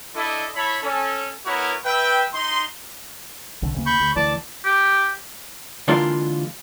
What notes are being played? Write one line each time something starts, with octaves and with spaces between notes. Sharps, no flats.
D4 E4 A4 D5 D#5
E4 C#5 E5 A5 B5
C#4 A4
B3 E4 F#4 A#4 B4 C#5
B4 E5 G5
D#4 C6
C2 D3
D2 C#3 A#3
B5 C#6 G6
D2
D2 E3 D5 A5 D6
G4
D3 E3 G#3 A#3 D4 F4